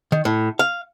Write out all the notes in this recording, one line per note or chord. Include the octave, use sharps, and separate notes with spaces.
D#3
A2
F5